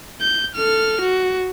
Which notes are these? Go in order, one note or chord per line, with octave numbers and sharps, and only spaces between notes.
G6
A4 F6
F#4